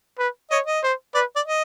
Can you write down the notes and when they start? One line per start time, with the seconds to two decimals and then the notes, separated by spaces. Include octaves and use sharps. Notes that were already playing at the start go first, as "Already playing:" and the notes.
0.19 B4
0.50 C#5 D#5
0.66 D#5
0.83 C5
1.15 B4 D5
1.36 D5
1.46 D#5